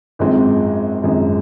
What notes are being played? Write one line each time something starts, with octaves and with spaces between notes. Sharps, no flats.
G#1 F#2 F3 G#3 C4
G#1 F#2 F3 G#3 C4